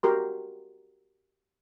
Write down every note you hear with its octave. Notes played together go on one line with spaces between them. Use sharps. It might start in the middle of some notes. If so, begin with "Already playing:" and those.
F#4 G4 A#4 C6